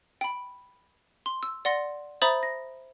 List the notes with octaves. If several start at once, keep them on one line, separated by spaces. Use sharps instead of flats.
G5 B5
C6
E6
D5 F#5 C6 A#6
C5 E5 A#5 B5 D#6 A6
A#6